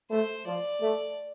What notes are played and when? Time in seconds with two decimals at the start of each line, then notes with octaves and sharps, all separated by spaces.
0.10 A3 C5
0.46 F3 D5
0.81 A3